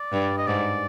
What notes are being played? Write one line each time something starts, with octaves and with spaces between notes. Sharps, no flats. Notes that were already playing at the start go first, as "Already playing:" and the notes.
Already playing: D5
G2
D#5
G#2 D5